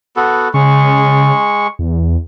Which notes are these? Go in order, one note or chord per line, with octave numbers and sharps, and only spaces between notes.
B3 F#4 A4
C#3 G#3 C#6
E2